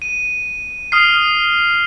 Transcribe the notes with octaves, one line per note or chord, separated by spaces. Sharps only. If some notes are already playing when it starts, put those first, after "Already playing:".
D#7
D#6 F6 C7